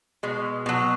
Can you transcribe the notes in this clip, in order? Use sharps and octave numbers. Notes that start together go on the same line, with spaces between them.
B2 G#3
B2 F#3